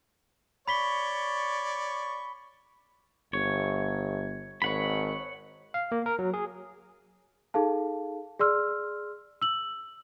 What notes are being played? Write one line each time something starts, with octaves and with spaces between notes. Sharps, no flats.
C#5 D5 B5 C#6 B6 G7
G1 C#5
G#1 C#5 F#5 B5
F5
A#3
A#4
F#3
G#4
D#4 G#4 A4 F5 A5
G#4 D5 C6 E6 F6
E6 F#7